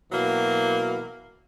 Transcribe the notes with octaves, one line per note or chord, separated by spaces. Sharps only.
B2 E3 F#3 A#3